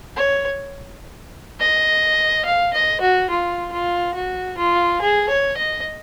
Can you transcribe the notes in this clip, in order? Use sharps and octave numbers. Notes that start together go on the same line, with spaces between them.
C#5
D#5
F5
D#5
F#4
F4
F4
F#4
F4
G#4
C#5
D#5